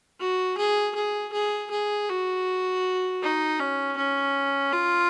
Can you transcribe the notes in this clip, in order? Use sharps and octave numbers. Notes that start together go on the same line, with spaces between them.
F#4
G#4
G#4
G#4
G#4
F#4
D#4
C#4
C#4
F4